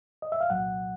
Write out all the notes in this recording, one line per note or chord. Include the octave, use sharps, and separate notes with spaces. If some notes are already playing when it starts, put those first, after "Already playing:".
D#5
E5
F5
C2 A#2 F#3 F#5